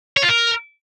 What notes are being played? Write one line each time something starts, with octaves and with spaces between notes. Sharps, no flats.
C#5
F4
A#4